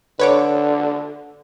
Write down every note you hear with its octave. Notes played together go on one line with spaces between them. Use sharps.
D3 B4 C#5 D6